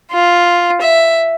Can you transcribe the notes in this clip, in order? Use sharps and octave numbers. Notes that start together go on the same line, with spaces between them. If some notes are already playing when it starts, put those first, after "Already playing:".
F4
E5